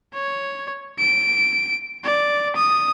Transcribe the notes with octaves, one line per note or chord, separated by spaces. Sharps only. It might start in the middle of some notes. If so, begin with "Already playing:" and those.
C#5
D7
D5
D#6